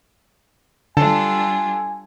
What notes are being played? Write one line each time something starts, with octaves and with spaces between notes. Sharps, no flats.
D3 G3 D4 F4 A4 G#5 A5